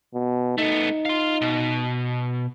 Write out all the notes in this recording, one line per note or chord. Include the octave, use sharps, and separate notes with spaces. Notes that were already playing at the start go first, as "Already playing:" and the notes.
B2
A3 B3 D#4
F5 C6
B2